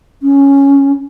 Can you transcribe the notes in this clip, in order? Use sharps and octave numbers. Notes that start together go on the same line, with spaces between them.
C#4